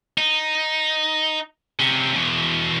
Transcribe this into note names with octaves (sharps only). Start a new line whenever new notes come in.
D#4
C3 C#4
E2 B2